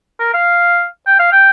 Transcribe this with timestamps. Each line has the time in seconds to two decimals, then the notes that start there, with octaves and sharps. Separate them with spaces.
0.20 A#4
0.34 F5
1.07 G5
1.20 F5
1.32 G5